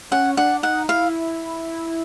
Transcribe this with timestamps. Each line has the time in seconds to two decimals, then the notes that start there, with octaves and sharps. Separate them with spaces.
0.11 C#4 F#5
0.37 D4 F#5
0.63 D#4 F#5
0.89 E4 F5